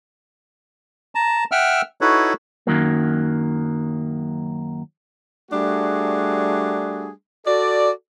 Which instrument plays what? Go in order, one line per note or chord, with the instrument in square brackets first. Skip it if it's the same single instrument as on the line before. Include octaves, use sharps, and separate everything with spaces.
[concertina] A5 A#5
E5 F#5 G5 E6 F6
D#4 E4 F#4 A4 B4 C#5
[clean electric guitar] F#2 D#3 F#3 A#3
[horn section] G3 A3 D4 F#4 G#4
F#4 A4 D5